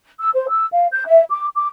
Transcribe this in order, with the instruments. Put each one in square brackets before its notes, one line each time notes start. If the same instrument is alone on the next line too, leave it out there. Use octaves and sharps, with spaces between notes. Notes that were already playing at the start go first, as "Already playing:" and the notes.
[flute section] E6
C5
E6
F5
G6
E5
D6
D6